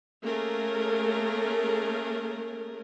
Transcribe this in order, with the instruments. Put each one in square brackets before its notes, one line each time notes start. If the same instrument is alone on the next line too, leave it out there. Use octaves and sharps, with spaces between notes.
[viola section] A3 A#3 C#4 G#4 A#4